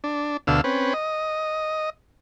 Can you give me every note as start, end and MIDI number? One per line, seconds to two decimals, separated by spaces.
0.04 0.37 62
0.47 0.61 38
0.47 0.61 47
0.47 0.61 50
0.47 0.61 77
0.47 0.61 88
0.64 0.94 60
0.64 0.94 61
0.64 0.94 71
0.94 1.90 75